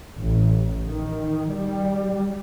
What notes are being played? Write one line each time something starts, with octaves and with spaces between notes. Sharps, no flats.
A1
D#3
G3